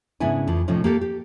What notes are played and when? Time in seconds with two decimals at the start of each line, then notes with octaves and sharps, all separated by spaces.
0.20 G#2 C#3 B3 D4 E4 G#5
0.47 F2 E3 F3
0.68 A2 C3 F3 C#4 D#4
0.84 A#3 G4 A4
1.01 G4